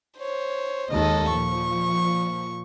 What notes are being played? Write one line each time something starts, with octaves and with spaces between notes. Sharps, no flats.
C5 C#5
D#2 D#3 G#3 A4 D#5
A#2 F3 C#6